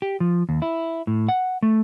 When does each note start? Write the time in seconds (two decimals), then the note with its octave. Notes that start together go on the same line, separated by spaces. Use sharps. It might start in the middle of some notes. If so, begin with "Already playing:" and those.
0.02 G4
0.20 F3
0.49 D#2
0.62 E4
1.07 A2
1.29 F#5
1.63 A3